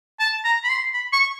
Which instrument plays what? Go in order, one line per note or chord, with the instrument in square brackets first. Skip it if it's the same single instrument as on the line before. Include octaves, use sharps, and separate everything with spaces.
[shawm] A5
A#5
B5
C6
B5
C#6